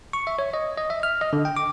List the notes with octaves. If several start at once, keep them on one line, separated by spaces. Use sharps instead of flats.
C#6
E5
C#5
D#5
D#5
E5
F6
D#5
D3
G5
D6